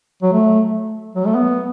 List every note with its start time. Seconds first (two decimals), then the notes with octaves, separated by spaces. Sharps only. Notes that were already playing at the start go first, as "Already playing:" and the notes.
0.22 F#3
0.33 A3
1.15 F#3
1.26 A3
1.35 B3